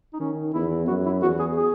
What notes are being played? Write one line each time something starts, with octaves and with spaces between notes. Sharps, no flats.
D#4
D#3 C#4
E2 E4
F#2 F#4
E4
E2 F#4
G#4
G#4